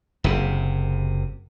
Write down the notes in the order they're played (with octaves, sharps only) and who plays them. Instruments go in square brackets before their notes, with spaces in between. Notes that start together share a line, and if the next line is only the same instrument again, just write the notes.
[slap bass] F#1 C3